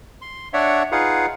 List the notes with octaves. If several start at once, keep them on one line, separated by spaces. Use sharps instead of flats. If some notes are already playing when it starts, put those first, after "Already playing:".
C6
D4 C#5 D5 E5 F#5
D#4 F4 G#4 B4 F5 F#5